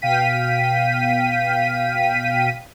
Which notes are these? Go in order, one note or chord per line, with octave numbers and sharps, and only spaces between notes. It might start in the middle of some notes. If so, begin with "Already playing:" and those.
B2 F5 G5 B6 D#7